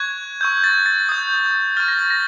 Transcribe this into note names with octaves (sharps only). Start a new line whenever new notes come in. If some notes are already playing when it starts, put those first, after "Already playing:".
Already playing: C#6 F#6 G#6
C#6 E6 G6
A6
A6
D#6 G6
C#6 F6 A6
A#6
A6
A#6